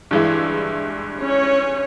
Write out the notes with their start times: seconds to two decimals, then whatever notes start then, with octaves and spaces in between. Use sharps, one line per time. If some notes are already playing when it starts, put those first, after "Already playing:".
0.11 G2 E3 G#3 E4
1.23 C#4 C#5